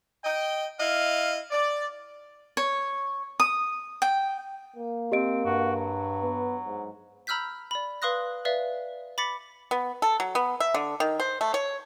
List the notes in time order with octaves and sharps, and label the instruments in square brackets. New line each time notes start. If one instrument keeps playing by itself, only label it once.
[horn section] D#5 G5
E4 D#5 F5
D5
[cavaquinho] C#5
D#6
G5
[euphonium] A#3
[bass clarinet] C4 [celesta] G4 D#5 D7
[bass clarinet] G2 [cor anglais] F#4
[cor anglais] F#3
[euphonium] B3
G#2
[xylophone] A#5 B5 E6 F6 G6 B6
D5 B5
B4 F5 C6 D#6 F#6 A#6
B4 D5 E5 F5
B5 D6 A6 B6 C#7
[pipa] B3
A4
F#3
B3
E5
D3
D#3
C5
A3
C#5